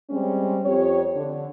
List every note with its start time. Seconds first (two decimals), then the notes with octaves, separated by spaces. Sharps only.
0.10 G3 G#3 C4 C#4
0.65 F2 G4 C#5
1.17 D3